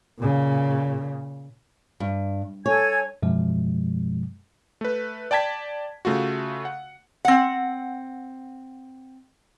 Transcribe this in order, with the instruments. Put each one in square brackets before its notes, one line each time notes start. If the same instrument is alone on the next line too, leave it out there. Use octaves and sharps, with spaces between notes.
[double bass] A#2 C#3
[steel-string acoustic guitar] G2
[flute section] A4 G#5 G#6 [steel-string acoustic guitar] C#5
[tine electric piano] F#2 B2 F3 G#3
[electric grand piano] A3 B4
D5 G5 A5 G#6 B6
C#3 A3 F4 F#4
F#5
[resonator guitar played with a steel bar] C4 F#5